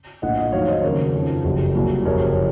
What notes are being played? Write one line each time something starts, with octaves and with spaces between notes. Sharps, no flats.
A#1 A2 F3 D#5 F#5
D#5 F#5
F2 D#3 F#3 C#5 F5
C5 D#5
D#2 C#3 F#3 A#4 C#5
F2 C#3 F3
F#1 F2 C3 F#3
C2 A#2 F#3
F#1 F2 C3 F#3 A#4 C#5